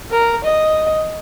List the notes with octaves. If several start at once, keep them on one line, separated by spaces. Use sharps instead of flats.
A#4
D#5